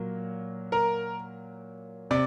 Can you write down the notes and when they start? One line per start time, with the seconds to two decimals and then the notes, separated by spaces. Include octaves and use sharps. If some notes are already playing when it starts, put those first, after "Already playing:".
Already playing: A#2 F#3 A#3
0.72 A#4 A#5
2.11 C3 D5 D6